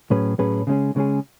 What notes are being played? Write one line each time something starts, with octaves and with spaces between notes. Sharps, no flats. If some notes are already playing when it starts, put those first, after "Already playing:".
A2 F#3 C#4 G#4 B4
A2 F#3 C#4 G#4 B4
C#3 G#3 C#4 G#4
C#3 G#3 C#4 G#4